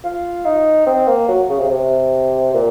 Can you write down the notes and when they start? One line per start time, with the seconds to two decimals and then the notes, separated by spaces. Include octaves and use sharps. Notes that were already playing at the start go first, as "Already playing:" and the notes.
0.04 F4
0.45 D#4
0.86 C4
1.08 A#3
1.28 F#3
1.49 C#3
1.60 C3
1.71 C3
2.54 A#2